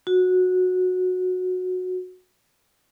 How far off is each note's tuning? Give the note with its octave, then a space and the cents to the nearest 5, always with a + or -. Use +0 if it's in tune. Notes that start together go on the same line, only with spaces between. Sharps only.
F#4 -15